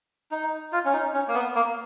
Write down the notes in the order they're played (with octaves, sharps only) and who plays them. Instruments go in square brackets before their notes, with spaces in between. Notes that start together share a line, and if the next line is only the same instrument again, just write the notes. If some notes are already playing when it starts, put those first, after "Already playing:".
[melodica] D#4
F4
C#4
D#4
C#4
A#3
B3
A#3